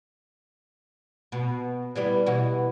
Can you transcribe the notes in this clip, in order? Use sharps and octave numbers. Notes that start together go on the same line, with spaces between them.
B2
E3 G3 B3
B2 E3 F#4